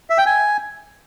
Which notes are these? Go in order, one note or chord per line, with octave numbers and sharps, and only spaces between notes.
E5
G5
G#5